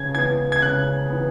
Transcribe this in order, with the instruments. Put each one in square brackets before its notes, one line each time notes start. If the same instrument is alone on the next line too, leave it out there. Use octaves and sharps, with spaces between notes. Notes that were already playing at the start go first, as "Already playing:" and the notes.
Already playing: [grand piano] C#3 G#6
E3 B3 G#6
G#6
C#3 F#6
E3 B3